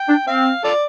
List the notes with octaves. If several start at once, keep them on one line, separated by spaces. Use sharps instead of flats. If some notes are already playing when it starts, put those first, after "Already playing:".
Already playing: G5
D4
C4 F5
F4 A4 D5